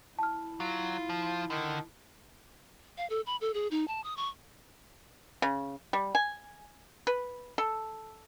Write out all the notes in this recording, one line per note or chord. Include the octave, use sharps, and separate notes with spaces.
E4 A5 F6
F#3 F4
F3
D3 D#3
F5
A4
B5
A4
G#4
D#4
A5
D#6
C#6
C#3
G3
G#5
B4
A4